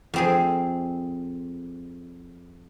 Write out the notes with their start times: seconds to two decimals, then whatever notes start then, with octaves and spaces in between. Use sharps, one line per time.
0.14 F2 C4 G#4